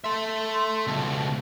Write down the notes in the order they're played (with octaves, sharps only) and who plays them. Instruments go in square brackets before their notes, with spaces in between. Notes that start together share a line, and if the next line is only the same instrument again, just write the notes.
[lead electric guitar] A4 E5 [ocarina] C6
[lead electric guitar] C#2 B2 [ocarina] A5